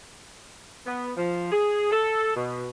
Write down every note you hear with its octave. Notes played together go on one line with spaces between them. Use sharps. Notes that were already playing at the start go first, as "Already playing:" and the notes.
B3
F3
G#4
A4
B2